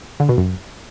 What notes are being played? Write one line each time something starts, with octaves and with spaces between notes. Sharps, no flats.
D3
B2
F#2